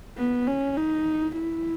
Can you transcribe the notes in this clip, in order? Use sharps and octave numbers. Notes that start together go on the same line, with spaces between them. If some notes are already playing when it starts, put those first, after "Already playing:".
B3
C#4
D#4
E4